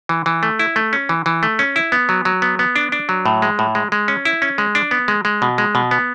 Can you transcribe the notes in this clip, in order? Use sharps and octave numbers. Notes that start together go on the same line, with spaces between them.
E3
E3
A3
E4
A3
C#4
E3
E3
A3
C#4
E4
B3
F#3
F#3
B3
B3
D4
D4
F#3
A2
G#3
A2
G#3
G#3
C#4
E4
C#4
G#3
D4
B3
G#3
G#3
B2
G#3
B2
B3